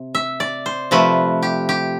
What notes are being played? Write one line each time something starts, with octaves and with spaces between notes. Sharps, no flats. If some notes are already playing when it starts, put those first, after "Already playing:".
Already playing: C3
E5
D5
C5
C3 F3 A3 B4
G4
G4